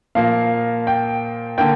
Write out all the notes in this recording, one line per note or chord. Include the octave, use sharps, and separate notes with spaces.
A#2 F3 A#3 F5
G5
D3 A#3 G5